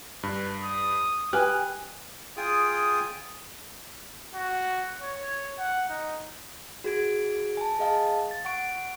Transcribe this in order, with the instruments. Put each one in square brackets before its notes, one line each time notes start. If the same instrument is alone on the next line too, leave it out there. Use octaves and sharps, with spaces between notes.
[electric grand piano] G2 [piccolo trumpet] B4
[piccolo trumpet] D#6
[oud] G4 [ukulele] B4 G#5 [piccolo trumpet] D#6 [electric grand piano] F6 F#6
[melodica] F4 G#4 G5 D#6
[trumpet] F#4
C#5
F#5
D#4
[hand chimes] F#4 G#4 G#6 D7
G#5 A5
G#4 D#5 F5 A5
A6
F#5 C#6 D7